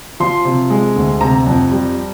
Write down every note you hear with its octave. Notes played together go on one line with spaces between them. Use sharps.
F3 C6
C3
G#3
D2
C3 A#5
F2
G3